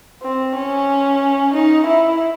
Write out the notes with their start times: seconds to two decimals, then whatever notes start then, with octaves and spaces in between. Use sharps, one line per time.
0.23 C4
0.55 C#4
1.54 D#4
1.86 E4